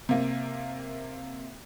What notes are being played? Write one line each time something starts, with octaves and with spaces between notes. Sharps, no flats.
C3 A#3